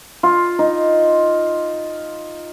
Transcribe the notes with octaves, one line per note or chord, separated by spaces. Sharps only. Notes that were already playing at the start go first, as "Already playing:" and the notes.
F4
D#4